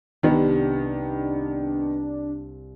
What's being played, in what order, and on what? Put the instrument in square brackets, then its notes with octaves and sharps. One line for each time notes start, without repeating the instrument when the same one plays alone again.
[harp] C2 [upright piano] D#3 B3 [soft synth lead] D4